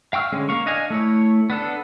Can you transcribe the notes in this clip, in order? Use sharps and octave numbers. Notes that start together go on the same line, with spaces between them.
F5 G5 C#6 E6 F6
D3 G#3 C#4
A#3 F5 C#6
D4 D#5 F5 G#5
A3 E4 C#5
B3 D4 A4